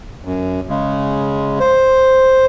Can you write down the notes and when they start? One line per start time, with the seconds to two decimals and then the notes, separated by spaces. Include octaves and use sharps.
0.25 F#2
0.69 C#3 G#3
1.60 C5